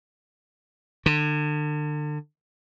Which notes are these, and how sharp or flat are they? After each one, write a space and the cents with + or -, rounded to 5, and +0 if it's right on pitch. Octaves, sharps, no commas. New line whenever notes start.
D3 +35